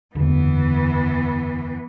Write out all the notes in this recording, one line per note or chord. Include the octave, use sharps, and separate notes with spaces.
F#1 E2 D3 E3 B3